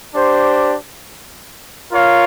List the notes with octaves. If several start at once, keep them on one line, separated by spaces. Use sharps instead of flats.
D4 G4 C5
F4 A#4 C#5 F5